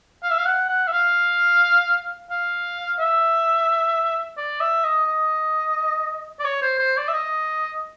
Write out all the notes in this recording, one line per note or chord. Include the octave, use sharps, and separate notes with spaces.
F5
E5
F5
F#5
F#5
E5
F5
F5
E5
D5
E5
D#5
D#5
D5
C#5
C5
C5
D5
E5
D#5